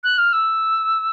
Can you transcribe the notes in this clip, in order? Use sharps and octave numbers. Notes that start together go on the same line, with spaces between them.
F#6
F6
E6